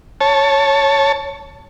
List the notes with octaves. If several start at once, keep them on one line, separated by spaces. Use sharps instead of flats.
C#5 A5